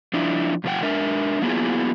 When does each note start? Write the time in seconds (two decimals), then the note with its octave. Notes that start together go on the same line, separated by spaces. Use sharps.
0.14 F3 D4 E4
0.64 G2 B2 F3 B4 F#5 G5
0.82 G#3 D4 A#4 E5
1.42 F#3 A#3 B3 E4 F4 G#4